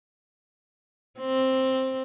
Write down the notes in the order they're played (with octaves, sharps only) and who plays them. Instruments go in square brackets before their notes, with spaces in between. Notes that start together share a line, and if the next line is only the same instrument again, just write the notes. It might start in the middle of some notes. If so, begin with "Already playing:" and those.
[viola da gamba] C4